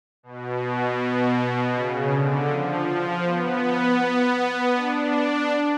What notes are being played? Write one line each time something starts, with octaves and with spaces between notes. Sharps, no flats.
B2
C#3
D3
F3
F3
B3
D4